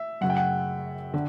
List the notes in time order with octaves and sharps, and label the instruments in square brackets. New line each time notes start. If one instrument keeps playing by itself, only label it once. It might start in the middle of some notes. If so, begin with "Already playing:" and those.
Already playing: [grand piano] E5
[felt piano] F#2 C#3 F#3 [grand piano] F#5
[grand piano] G5
F#5
[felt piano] D3